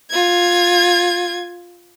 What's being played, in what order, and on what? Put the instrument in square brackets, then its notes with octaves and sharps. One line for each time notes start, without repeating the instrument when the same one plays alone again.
[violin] F4 G#6